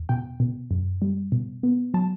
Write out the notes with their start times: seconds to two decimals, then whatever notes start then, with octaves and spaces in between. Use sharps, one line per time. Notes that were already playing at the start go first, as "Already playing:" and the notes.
Already playing: E2
0.09 B2 G5
0.40 B2
0.71 F#2
1.02 G3
1.32 B2
1.63 B3
1.94 F#3 A5